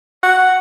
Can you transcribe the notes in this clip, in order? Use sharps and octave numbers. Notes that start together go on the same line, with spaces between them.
F#5